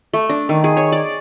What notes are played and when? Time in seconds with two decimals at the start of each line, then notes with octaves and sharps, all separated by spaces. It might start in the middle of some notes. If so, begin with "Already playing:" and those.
0.14 A3
0.29 D4
0.49 D#3
0.64 G#4
0.77 C#5
0.92 D5